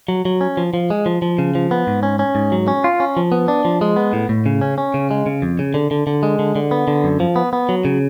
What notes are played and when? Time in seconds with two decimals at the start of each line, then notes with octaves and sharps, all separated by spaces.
0.08 F#3
0.25 F#3
0.41 C#4
0.57 F3
0.74 F3
0.90 G#3
1.06 F3
1.22 F3
1.39 C#3
1.55 F3
1.71 B3
1.87 G#2
2.03 C#4
2.19 C#4
2.35 G#2
2.52 F#3
2.68 C#4
2.84 F4
3.00 C#4
3.17 F3
3.32 B3
3.48 D4
3.65 F3
3.81 G#3
3.96 B3
4.13 A2
4.29 A2
4.46 C#3
4.61 C#4
4.78 C#4
4.94 C#3
5.11 G#3
5.26 C#3
5.42 F2
5.59 C#3
5.74 D3
5.91 D3
6.07 D3
6.23 G#3
6.39 D3
6.56 D3
6.71 B3
6.88 D3
7.04 F#2
7.20 F3
7.36 B3
7.53 B3
7.69 F#3
7.85 C#3